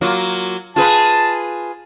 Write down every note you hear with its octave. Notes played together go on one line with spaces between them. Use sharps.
F#3 A#3 F4
F4 G#4 B4 A5